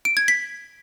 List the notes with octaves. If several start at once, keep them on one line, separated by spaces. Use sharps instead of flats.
D7
G#6
B6